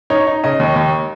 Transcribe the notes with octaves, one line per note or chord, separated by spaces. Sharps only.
D#4 C#5
D#4
C#3 D#5
D#2
D#2